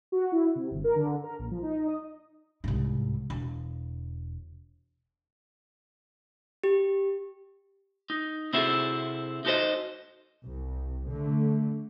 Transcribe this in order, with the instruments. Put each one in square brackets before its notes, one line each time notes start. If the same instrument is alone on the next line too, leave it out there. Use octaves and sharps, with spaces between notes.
[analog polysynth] F#4
E4
C3
G1
A#4
D3
A#4
A#1
F3
D#4
D#5
[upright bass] C2 G#2
E1
[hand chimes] G4
[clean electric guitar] D#4
C3 C4 E4 F#4 G#4 A4
D#4 F#4 A4 A#4 C5 D#5
[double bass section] C2
D3 A3